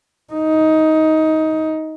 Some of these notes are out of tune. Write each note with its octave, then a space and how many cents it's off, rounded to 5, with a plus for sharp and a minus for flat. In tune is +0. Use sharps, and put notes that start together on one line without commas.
D#4 +15